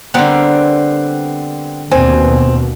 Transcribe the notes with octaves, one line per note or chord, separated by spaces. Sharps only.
D3 G3 B3 C4 A#4
D#2 B2 C4 G#5